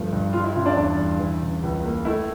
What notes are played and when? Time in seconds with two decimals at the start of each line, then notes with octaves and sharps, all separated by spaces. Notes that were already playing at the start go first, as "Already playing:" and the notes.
Already playing: G2 F3 A3
0.12 G2
0.33 G3 F4
0.44 E4
0.55 C#3 F4
0.66 D4
0.76 E2 D4
0.98 E2
1.19 E3
1.42 C#3
1.63 C#2
1.84 A#3
2.05 A3 E4